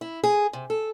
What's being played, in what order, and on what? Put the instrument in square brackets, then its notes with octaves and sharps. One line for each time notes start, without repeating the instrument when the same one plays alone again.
[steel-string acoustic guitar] E4
G#4
C3
A4